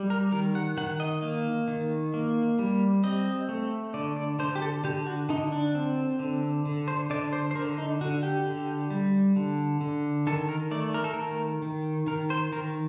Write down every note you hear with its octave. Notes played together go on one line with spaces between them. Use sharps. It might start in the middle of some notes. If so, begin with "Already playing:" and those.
Already playing: G3
A#4
D#3 A#4
F#5
D#3 F#5
D#5
A#3
D#3
A#3
G3
C4 D#5
A3
D3 D5
D5
D3 C5
G4
A4
D3 G4
F#4
D3 D#4
D4
C4
D3
D3
C5
D3 D5
C5
C5
D3 A#4
D#4
D3 F#4
G4
D3
G3
D3
D3
D#3 A4
A#4
A3 D5
A#4
A4
D#3 A#4
D#3
D#3 A#4
C5
D#3 A#4